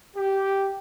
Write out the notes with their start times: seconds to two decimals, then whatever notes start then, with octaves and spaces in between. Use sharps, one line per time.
0.15 G4